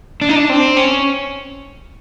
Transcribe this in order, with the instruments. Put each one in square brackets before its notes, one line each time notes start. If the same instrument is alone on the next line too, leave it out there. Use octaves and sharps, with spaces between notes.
[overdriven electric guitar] D4
D#4
D4
C4
C#4